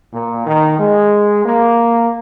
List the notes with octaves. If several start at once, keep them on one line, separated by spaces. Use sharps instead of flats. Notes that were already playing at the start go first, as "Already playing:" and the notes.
A#2
D#3
G#3
A#3